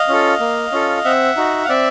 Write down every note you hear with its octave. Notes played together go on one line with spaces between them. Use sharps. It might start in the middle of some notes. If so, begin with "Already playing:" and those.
Already playing: D#5 F5
C#4 F4 A4
A#3
C#4 F4 A4
C4 E5 F#5
D#4 F#4
F5
C4 D5 E5